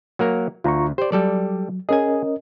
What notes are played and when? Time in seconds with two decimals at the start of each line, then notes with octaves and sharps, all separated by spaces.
0.19 F#3 A#3 A#4
0.64 D2 F4 A#5 C#6
0.98 G4 C5 D5
1.12 F#3 G3 A4 D5
1.89 C#4 G#4 A#4 D#5 G#5